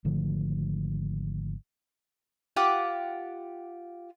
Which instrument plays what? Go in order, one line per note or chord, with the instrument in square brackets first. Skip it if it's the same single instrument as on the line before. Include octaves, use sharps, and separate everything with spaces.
[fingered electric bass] G#1 D3 F3 A3
[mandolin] F4 G4 F#5 D6